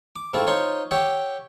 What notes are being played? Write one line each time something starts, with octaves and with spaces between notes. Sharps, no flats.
D6
G#2 A3 C4 E4 F4
D#4 F4 C5 C#5 C6 C#6
G4 C#5 E5 F#5 G5